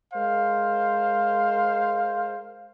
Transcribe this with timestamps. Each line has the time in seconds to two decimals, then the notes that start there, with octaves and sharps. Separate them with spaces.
0.14 G#3 A#4 C5 F5